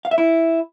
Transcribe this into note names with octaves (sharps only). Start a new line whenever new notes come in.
F5
E5
E4